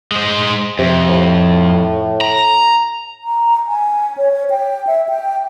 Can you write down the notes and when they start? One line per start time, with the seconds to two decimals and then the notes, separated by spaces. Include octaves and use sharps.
0.12 G#3 C5
0.79 F2 C3
1.09 A2
2.21 A#5
3.24 A#5
3.68 G#5
4.17 C#5
4.50 G5
4.87 E5
5.09 G5